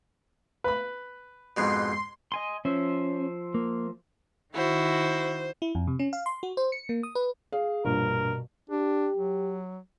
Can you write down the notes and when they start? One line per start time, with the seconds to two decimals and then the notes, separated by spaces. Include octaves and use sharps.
0.64 B4 B5
1.57 F2 G#2 B2 C6
2.32 D#5 G#5 C6
2.65 F3 C#4 C5 E5
3.54 A#3
4.55 D#3 E4 F#4 C5
5.62 E4
5.75 F2
5.87 C3
5.99 C#4
6.13 F5
6.26 C6
6.43 F#4
6.57 C5
6.72 C#7
6.89 A#3
7.03 D#6
7.15 B4
7.52 G#4 F5
7.85 A#1 G2 B2 A#4
8.70 D4 G4
9.17 F#3